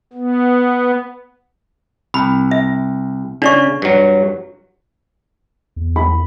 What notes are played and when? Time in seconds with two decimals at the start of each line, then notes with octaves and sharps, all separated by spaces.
0.13 B3
2.14 C2 B5
2.51 E5
3.42 C#3 D4 D5 C#6
3.82 G2 F#3
5.76 E2
5.96 B5